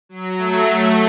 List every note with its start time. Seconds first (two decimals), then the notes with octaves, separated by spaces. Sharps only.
0.09 F#3
0.38 A3
0.67 A3